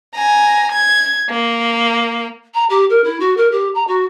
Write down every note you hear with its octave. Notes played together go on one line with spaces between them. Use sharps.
G#5 A#5
G#6
A#3
A#5
G4
A#4
E4
F#4
A#4
G4
A#5
F#4